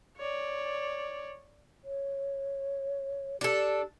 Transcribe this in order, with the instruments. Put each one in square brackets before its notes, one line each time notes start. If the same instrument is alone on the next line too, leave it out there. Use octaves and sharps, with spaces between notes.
[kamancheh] C#5 D5
[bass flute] C#5
[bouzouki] D4 A4 [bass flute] G4